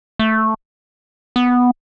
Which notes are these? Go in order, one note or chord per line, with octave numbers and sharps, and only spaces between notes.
A3
B3